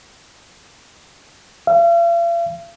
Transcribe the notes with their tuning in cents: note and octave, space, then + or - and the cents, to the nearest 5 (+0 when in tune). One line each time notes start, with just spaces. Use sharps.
F5 -45